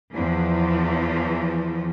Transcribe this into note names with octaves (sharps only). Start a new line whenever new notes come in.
E2 E3 F3